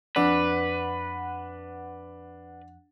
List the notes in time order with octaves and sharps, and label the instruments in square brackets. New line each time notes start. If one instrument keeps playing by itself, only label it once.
[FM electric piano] F2 F#5 [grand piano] D4 [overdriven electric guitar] B4